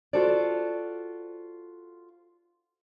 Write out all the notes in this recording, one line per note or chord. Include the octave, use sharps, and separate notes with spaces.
F4 F#4 A4 C5 D5